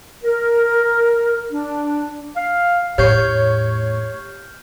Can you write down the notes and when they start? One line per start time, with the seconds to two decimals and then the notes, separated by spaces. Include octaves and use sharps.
0.24 A#4
1.51 D4
2.37 F5
2.98 E2 A2 G4 C#5 F6 G6 C7